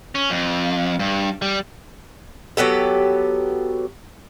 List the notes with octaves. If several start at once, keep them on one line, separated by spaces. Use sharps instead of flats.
C#4
F2
G2
G3
F#3 B3 G4 A4